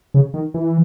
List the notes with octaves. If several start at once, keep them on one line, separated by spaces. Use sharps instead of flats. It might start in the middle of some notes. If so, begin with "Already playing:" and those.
C#3
D#3
E3